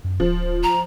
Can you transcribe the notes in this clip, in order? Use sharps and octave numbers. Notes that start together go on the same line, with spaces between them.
F#2
D1 F3
A#5